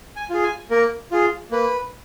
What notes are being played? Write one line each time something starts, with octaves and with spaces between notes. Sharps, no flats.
G#5
F4 G#4
G#5
A#3 A#4
F4 G#4
A#3 B4